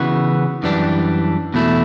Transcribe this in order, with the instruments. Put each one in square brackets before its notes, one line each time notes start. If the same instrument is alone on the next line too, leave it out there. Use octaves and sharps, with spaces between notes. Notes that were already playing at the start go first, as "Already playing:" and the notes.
Already playing: [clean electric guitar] C#3 E3 B3 F#4
F#2 E3 G3 D4
E2 B2 A3 E4